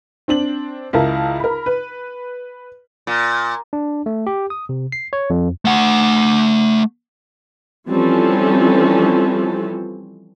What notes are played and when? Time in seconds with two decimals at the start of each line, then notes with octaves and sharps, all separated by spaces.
0.28 C4 D4 F#7
0.93 C#2 E4 A#4 A5
1.40 A#4 B5
1.66 B4
3.07 A#2
3.73 D4
4.06 A3
4.27 G4
4.50 D#6
4.69 C3
4.92 C7
5.13 C#5
5.30 F2
5.65 A3 F#5
7.90 E3 F3 G3 C4 C#4 A4